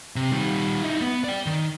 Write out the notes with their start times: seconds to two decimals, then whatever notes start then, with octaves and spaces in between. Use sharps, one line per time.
0.16 C3
0.32 D#3 G3
0.83 D#4 E4
1.01 B3
1.24 D5 G5
1.46 D#3